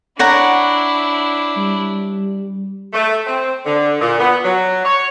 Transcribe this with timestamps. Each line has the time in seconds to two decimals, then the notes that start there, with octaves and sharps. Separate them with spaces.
0.19 D4 E4 C#5 F#5 A#5
1.57 G3
2.93 A3
3.27 C4
3.65 D3
4.00 A#2
4.20 B3
4.44 F#3
4.85 C#5